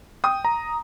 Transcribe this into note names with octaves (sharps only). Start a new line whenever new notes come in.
G5 D#6
A#5